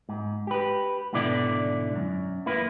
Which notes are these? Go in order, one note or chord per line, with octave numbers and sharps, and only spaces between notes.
G#2
G4 B4
G#2 B2 D3 E4 D5
F#2
A#3 E4 B4